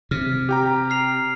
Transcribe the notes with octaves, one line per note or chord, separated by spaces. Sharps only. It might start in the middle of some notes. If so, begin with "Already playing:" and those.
C3 F6
G4 G5 A#5
F6 C7 F7